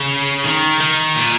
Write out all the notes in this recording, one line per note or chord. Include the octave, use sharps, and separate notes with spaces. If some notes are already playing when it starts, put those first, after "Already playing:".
Already playing: C#3
D#3
D#3
A#2